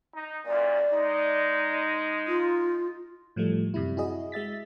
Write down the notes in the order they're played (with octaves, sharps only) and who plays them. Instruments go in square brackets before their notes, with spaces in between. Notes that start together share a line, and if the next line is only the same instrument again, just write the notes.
[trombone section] D#4
[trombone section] F#2 A#2 [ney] D5
[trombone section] G#3 D#4
[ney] F4
[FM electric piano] A2 F3 G3 A3
F#2 C3 G3 E4
E4 F#4 G#4 D#5
G#3 E5 A6 B6